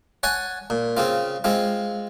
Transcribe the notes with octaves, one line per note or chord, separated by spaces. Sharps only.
C#5 F#5 G#5 A5
A#2
C#3 C4 F4
G#3 C4 F4